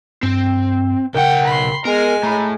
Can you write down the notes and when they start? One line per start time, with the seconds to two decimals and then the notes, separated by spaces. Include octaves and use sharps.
0.23 G2 C4
1.15 B1 C#3 A#4 F#5 G5
1.47 B5 C6
1.85 G#3 B3 A#4 G#5 C7
2.23 A2 A#5 B5